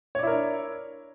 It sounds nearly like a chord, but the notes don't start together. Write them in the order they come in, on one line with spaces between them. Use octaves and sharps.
C#5 D5 E4 A#4 D4